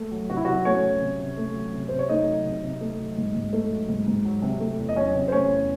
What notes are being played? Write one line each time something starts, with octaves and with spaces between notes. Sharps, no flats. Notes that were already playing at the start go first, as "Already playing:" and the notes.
Already playing: A3
F#3
C3 F#4
E4
C3 F#3 F#4
A3 C#4 C#5
F#3
C3
C3
A3
F#3
C3
C3 C5
C#5
A3 D#4 D#5
F#3
C3
C3
A3
F#3
G#2
G#2
A3
F#3
G#2
G#2
F#3
C3
A3
E2
D#5
F#3 C#4 C#5
C3
C5
A3 C#4 C#5
E2